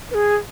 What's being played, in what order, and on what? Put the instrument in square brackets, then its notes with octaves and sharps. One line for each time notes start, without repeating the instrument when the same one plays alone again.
[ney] B4
G#4